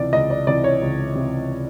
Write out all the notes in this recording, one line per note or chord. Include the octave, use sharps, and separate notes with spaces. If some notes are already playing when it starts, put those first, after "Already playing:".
Already playing: C#2 C3 E3 D5
C#2 D#5
D5
C3 E3 D5
C#5
C#2
C3 E3